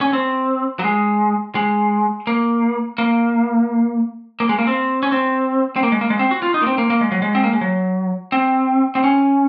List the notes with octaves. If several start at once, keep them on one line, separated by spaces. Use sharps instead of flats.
C#4
C4
F#3
G#3
G#3
A#3
A#3
A#3
G#3
A#3
C4
C#4
C4
C4
A#3
G#3
A#3
G#3
C4
F#4
F4
D#4
A#3
C4
A#3
A#3
G#3
F#3
G#3
C4
A#3
G#3
F#3
C4
C4
C#4